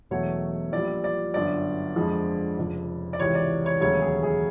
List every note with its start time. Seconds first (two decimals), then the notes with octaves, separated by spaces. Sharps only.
0.10 E1 E2 B2 F#3 A3 C#5
0.72 A#1 A#2 G3 D5
1.04 D5
1.34 G1 F#2 D3 D5
1.95 F2 D3 F3 G#3
2.57 F1 F2 C#3
3.13 D5
3.19 C#2 C3 E3 C#5
3.35 D5
3.66 C#5
3.81 E1 D#2 C#3 F#3 A3 C#5
4.01 G#4
4.23 G#4